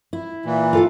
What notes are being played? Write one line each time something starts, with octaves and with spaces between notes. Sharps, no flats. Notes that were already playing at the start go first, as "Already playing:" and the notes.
E4
A#2 E3
F4 A4 F5